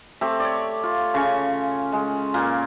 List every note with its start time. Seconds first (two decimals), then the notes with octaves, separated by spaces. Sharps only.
0.21 A3 C4 G4
0.40 C#5 D5
0.83 F4
1.14 C#3 C#4 C#6
1.92 G#3
2.34 A#2 A#3